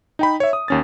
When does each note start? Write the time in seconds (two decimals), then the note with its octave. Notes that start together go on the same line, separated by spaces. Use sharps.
0.19 D#4 G5 B5
0.40 C#5 E5
0.53 D#6
0.68 D#2 C#4 A6